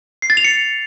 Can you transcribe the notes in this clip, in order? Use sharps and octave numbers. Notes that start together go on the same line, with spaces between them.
C7
A6
F7
C#7